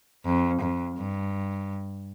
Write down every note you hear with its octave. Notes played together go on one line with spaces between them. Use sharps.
F2
F2
G2